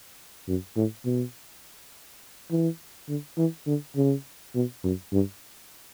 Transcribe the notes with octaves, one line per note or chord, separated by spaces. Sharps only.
F#2
A2
B2
E3
D3
E3
D3
C#3
B2
F#2
G2